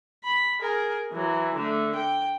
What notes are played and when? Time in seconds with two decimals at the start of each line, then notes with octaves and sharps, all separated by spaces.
0.24 B5
0.60 G#4 A#4
1.12 E3 F#3
1.55 D3 A3
1.95 G5